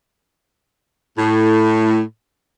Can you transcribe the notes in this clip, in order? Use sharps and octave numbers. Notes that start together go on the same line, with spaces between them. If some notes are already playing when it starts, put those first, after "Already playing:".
A2